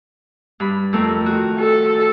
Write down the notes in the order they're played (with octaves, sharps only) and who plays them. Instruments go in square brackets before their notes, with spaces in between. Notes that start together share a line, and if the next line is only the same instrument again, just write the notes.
[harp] G2 B5
F2 A3 A#4
D#3 F#4
[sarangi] A4